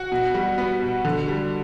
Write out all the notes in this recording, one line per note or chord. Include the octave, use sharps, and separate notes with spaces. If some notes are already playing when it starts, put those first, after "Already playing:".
Already playing: F#4
B2
G3
B3
B2
D3
G3